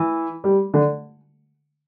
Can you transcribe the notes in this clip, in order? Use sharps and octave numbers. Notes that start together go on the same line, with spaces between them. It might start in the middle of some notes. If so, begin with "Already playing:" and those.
Already playing: E3
G3
D3